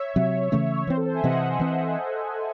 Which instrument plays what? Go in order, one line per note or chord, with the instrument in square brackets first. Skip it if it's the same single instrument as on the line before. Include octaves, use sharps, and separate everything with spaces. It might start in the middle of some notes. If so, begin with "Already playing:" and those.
Already playing: [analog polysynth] C#5 E5
[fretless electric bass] C3 F#3 C4
C#3 E3 A3 C#4
[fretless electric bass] E3 C4 [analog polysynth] C5
[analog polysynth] A4
C5
E5 G#5
[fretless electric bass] C3 E3 C4 [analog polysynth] D#5 F#5
[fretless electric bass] E3 C4